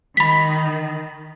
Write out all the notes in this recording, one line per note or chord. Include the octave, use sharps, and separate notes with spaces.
D#3 B5 B6